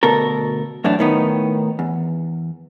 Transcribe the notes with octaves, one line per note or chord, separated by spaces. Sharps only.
D2 B2 A4 A#4
F#2 A2 E3 D4
A2 D#3 B3 D#4
E2